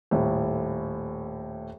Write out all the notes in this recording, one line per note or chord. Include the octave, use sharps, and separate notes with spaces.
D#1 A2